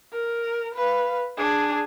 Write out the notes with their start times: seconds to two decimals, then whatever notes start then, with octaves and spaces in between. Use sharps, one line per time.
0.13 A#4
0.75 B4 F5
1.38 D4 G#4